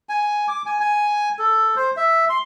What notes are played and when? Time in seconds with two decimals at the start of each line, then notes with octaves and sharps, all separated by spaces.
0.09 G#5
0.48 D6
0.66 G#5
0.80 G#5
1.39 A4
1.76 C5
1.97 E5
2.30 C6